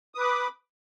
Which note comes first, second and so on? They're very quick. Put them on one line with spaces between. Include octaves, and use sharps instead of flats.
D#6 B4 D6 B5